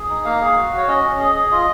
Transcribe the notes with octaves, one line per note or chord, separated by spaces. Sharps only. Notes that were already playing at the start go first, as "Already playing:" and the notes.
Already playing: G#4
D#4
A#3 F5
G#4
F#4
F#4 C#5
C#4 D#5
C#4
G#4
G#4
F4 D#5